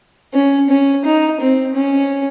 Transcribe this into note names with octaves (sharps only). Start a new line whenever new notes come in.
C#4
C#4
D#4
C4
C#4